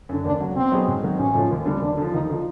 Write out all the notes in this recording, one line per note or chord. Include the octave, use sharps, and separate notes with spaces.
F#2 D3
D#2 D4
C#3 F#3
B2 C4
F#3 B3 D#4 G#4
G#2
D#3 F#3
A1 C#4
G#2 F3 A3
D#2
D3 G3 C4
D#2 D4
D3 F3
D#2 D#4
D3 F3